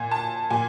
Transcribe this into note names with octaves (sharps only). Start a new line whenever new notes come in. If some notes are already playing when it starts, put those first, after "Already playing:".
Already playing: A#2 G#5
A5
A#2 G#5